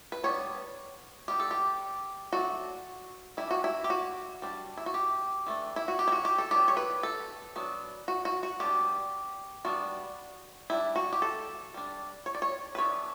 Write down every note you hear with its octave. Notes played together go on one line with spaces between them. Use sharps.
B4
G3 B3 D4 C#5
G3 B3 D4 G4
A4
G4
F#3 A3 D4 F#4
E3 G3 D4 E4
F#4
E4
G4
F#4
G3 D4
E4
F#4
G4
E3 A3 D4
E4
F#4
G4
E4
F#4
G4
A4
F#3 B3 D4 G4
C#5
B4
A4
F#3 B3 D4
F#4
F#4
F#4
G3 B3 D4 G4
G3 B3 D4 F#4
G3 D4 E4
F#4
G4
A4
G3 D4
C#5
D5
C#5
B4
E3 B3 D4 C#5